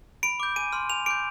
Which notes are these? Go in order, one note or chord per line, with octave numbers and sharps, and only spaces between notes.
B5 D7
D6 G6
G#5 D#7
C6 F6
G#5 F7
D6 G6 D7